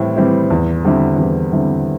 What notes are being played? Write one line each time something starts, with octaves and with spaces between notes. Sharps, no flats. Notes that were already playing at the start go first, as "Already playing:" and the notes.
Already playing: A2 E3 G3 C4 E4
E3 G3 C4 E4
E2
D3 G3 C4 E4
E2
D3 G3 C4 E4